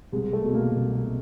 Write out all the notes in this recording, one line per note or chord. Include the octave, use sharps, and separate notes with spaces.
C2 G#3
A3
B2
A#3
C2